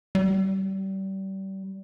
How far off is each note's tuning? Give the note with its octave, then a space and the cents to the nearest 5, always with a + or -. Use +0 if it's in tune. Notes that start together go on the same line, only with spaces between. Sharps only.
G3 -30